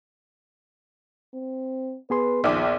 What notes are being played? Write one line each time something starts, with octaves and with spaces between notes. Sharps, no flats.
C4
B3 G#4 B4 C6
A#1 D#2 F3 D6